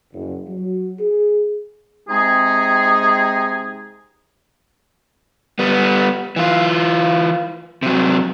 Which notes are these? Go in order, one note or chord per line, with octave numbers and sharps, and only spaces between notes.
F#1
F#3
G#4
C3 G#3 C4 D#4 G#4
G3 B3
E3 F4
C3 F#3